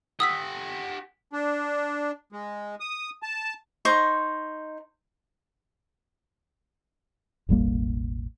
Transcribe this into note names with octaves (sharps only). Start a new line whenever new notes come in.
G4 F#5 D#6 E6 B6
D4
G#3
D#6
A5
D#4 C5 C#6
E1 A1 G3 A#3